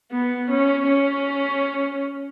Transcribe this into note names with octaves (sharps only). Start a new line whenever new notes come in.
B3
C#4
C#4